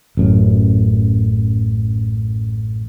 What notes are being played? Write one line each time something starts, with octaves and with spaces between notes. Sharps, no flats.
A1 F#2